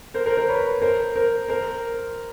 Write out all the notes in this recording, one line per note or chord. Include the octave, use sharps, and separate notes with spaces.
A#4 C5
A#4 C5
A#4 C5
B4 C#5
A#4 C5
A#4 C5
A#4 C5